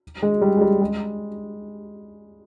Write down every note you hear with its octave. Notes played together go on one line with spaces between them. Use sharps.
G#3
G3
G#3
G3
G#3